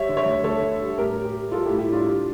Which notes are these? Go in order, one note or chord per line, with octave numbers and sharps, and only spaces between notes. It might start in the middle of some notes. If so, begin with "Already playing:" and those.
Already playing: G3 C#5 E5
D3
C#5 E5
D2
D2 A4 C#5
D3
G3
A2 G4 A#4
G3
G4 A#4
G3
G3 F4 A4
A2 E4 G4
E4 G4
A2 D4 F4
G3